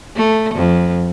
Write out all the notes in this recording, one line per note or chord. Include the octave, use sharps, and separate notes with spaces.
A3
F2